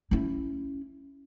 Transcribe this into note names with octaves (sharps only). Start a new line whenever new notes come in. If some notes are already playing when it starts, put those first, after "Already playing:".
C#4 E4